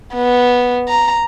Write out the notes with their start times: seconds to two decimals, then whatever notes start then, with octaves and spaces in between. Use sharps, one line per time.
0.14 B3
0.88 A#5